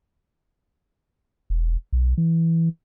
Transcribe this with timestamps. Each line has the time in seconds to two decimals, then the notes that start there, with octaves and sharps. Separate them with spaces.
1.50 E1
1.93 B1
2.18 E3